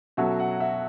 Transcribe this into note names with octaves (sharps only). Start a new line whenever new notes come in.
B2 F#3 C#4 F#4 A4 E5
F#5
E5